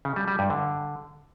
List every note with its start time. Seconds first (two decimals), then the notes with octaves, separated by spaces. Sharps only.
0.05 C#3
0.16 G3
0.28 G3
0.39 G2
0.50 D3